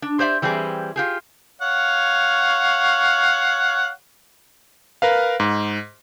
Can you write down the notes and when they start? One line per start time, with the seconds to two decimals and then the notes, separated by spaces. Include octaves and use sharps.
0.02 D4
0.19 G4 C5 D5 E5
0.42 E3 G3 C4 E4 G#4
0.96 F4 G4 G#4
1.61 C#5 F5 F#5
5.02 A#4 B4 F5
5.40 G#2